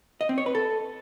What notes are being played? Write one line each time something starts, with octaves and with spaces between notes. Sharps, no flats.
D#5
C4
C#5
B4
A4